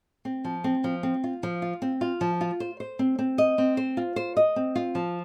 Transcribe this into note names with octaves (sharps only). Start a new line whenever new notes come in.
C4
F3
C4
F3
C4
F4
F3
F4
C4
F4
F3
F4
C5
C5
C4
C4
D#5
C4
C5
F4
C5
D#5
C4
F4
F3